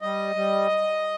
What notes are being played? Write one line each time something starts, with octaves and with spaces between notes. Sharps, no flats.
G3 D#5
G3